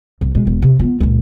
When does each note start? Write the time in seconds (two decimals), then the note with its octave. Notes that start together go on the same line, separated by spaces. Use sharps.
0.21 C2
0.35 B2 G#3
0.47 E1 G#3
0.62 C3
0.79 B3 F4
1.00 C#2 A#2